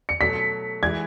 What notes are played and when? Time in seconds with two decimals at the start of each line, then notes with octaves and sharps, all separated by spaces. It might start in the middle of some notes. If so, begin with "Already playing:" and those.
0.09 C#7
0.21 B2 F#3 A3 B6
0.83 E3 G#3 G#6